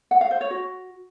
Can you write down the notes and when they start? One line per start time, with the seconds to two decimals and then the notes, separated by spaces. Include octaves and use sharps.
0.11 F#5
0.21 F5
0.31 C5
0.41 C#5
0.51 F#4